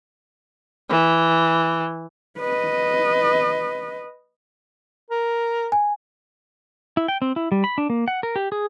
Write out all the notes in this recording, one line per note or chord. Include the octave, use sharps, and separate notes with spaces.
E3
B4 D#5
A#4
G#5
E4
G5
C4
E4
G3
B5
D4
A#3
F#5
A#4
G4
G#4